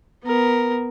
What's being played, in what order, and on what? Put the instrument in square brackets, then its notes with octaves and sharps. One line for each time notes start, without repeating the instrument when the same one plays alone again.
[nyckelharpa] B3 A#4